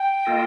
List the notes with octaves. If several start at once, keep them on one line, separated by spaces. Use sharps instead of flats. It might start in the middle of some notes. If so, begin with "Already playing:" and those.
Already playing: G5
A#3 F4 A4 D#5